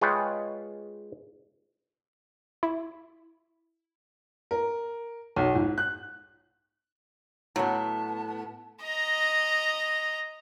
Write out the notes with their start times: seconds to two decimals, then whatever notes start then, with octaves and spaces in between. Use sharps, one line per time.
0.01 G#3 F4 G#4 B4 C#5 G5
2.63 E4
4.51 A#4
5.36 B1
5.55 G#2
5.78 F#6
7.56 A2 F#3 B3 A5
8.83 D#5 A#5